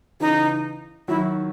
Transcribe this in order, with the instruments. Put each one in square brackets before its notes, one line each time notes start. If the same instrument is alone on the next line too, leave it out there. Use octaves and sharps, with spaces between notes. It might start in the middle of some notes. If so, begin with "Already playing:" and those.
[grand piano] C#3 E3 [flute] D#4
[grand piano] D#3 F#3 [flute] E4